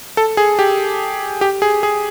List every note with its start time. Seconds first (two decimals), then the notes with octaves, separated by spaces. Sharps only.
0.17 A4
0.37 G#4
0.59 G4
1.41 G4
1.62 G#4
1.83 G#4